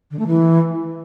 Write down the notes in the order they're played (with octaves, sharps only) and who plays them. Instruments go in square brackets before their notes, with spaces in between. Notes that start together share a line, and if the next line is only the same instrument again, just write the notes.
[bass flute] D3
A3
E3